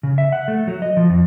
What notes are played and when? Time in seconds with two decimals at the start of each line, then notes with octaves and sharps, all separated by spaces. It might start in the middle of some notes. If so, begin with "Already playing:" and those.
0.03 C#3
0.18 E5
0.32 F#5
0.48 A3
0.68 F#3
0.82 D#5
0.97 F3
1.10 F2